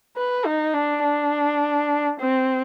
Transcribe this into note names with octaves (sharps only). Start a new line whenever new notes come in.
B4
D#4
D4
D4
C4